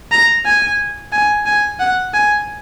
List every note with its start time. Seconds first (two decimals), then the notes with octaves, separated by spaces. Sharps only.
0.12 A#5
0.46 G#5
1.12 G#5
1.46 G#5
1.79 F#5
2.14 G#5